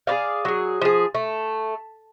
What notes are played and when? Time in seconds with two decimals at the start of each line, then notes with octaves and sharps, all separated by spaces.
0.07 G#4 C5 D5 F5
0.45 F#3 G#4
0.81 F3 G#4
1.15 A3